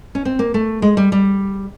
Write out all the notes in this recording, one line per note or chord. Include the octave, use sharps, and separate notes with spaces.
C#4
C4
A#3
A3
G#3
G3
G3